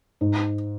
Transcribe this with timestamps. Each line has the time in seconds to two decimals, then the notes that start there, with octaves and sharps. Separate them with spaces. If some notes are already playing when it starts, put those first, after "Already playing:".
0.21 G#2